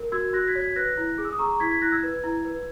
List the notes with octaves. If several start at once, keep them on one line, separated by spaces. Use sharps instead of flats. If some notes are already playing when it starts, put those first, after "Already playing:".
Already playing: A#4
F#4 E6 G#6
F#4 F#6 A#6
G#6 B6
C#5
G#6 B6
B4 F#6 A#6
E4
G#4
E6
D#6
G#4 A#5 C#6
E4 G#6 B6
G#6 B6
E4 F#6 A#6
E6 G#6
B4
E4
B4